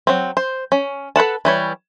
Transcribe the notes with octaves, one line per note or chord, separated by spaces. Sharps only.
F#3 C4
C5
C#4
A4 B4 F#5 A5
E3 G3 C#5